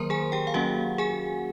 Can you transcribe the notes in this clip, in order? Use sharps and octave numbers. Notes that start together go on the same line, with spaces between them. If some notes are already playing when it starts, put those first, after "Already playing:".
Already playing: D#3 F#3 A#3 A#4 C5 A#5 C6
G#4 G#5
G4 G5
F5
F#3 A#3 C#4 F#4 F#5
G#4 G#5